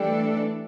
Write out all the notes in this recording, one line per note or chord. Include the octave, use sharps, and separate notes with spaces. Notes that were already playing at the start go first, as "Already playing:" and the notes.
Already playing: E3 G3 A3 D4 A4